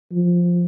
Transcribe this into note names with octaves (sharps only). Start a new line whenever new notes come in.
F3